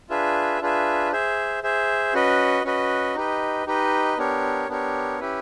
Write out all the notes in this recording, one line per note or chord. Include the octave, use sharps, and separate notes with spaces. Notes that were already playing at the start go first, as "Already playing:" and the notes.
D4 F4 G#4 B4 E5
D4 F4 G#4 B4 E5
G#4 C5 E5
G#4 C5 E5
C#4 F#4 B4 D#5
C#4 F#4 B4 D#5
D#4 G4 B4 D#5
D#4 G4 B4 D#5
B3 D4 G4 A#4 C#5
B3 D4 G4 A#4 C#5
C#4 E4 G4 B4